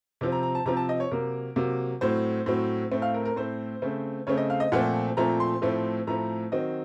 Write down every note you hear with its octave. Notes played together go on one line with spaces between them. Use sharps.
C3 F3 C4
A#5
A#5
A5
C3 F3 C4 A#5
A5
D#5
C#5
C3 F#3 A#3 A#4
C3 F#3 A#3
A2 F#3 C4 C5
A2 F#3 C4
A2 A3 C4
F5
A#4
A#4
A2 A3 C4 C5
C#3 A3 C4
C#3 A3 C4 C#5
D#5
F5
D#5
A#2 F3 A3 C4 F#5
A#2 F3 A3 C4 A#5
C6
A2 F3 A3 C4
A2 F3 A3 C4 A#5
D#3 F#3 C4 D#5